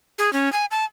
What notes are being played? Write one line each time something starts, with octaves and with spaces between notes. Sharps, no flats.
G#4
C#4
G#5
A5